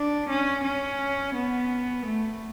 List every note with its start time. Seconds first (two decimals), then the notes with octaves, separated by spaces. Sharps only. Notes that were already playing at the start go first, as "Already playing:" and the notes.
Already playing: D4
0.29 C#4
0.64 C#4
1.34 B3
2.05 A3